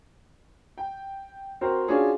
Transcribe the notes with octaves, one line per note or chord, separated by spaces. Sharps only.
G5
C4 F#4 A#4 C5
C#4 D4 F4 F#4 G#4 C#5